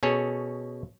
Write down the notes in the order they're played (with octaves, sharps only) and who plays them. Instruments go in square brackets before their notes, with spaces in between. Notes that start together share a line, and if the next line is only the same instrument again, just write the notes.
[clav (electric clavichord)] B2 C#4 G#4 A4 C#5